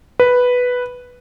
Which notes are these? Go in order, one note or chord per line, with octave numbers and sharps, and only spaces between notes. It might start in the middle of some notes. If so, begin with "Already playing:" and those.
B4